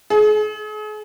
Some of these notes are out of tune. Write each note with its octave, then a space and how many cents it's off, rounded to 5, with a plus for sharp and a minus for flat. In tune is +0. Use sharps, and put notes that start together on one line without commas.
G#4 +40